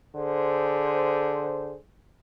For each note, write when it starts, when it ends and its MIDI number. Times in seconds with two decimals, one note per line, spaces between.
0.15 1.75 50
0.15 1.75 68
0.15 1.75 72